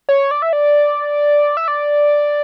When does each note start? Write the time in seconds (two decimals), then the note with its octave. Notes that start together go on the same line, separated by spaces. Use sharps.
0.09 C#5
0.31 D5
0.42 E5
0.53 D5
1.57 E5
1.68 D5